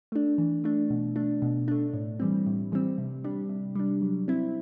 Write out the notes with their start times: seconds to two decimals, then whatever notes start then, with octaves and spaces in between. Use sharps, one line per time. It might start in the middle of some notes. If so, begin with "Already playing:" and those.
0.12 A3 D4
0.38 E3
0.64 A3 D4
0.90 B2
1.16 A3 D4
1.42 B2
1.68 A3 D4
1.94 A2
2.20 E3 G3 C4
2.46 A2
2.72 E3 G3 C4
2.98 C3
3.24 G3 D4
3.49 C3
3.75 G3 D4
4.02 F#3
4.28 C4 E4